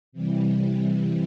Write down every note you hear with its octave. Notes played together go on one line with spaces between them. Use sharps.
C3 E3 G3